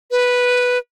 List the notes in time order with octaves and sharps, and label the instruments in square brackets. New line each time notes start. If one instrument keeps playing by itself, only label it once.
[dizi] B4